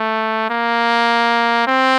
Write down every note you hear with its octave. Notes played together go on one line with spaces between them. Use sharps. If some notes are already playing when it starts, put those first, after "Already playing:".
Already playing: A3
A#3
C4